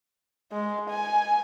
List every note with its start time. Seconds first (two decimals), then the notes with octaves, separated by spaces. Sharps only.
0.52 G#3
0.90 G#5